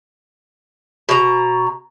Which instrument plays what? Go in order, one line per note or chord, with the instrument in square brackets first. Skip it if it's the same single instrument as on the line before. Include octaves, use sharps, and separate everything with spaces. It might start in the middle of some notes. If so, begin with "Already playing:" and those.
[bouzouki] B2 A#5